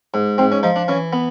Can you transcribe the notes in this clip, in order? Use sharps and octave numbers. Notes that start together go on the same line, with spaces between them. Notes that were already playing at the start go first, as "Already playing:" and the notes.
G#2
G#2 C4
C#4
F3 D#4
D4
E3 C#4
B3